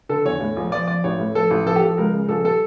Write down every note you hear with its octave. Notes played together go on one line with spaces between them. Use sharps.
D3 A4
E2 C#5
A2
A#1
F3 D5
F3 D5
A1 C#5
A2
F3 A4
A1
F3 A4
G4
F3 A4
C#2 A#4
C#3
A#1 A4
G3 A4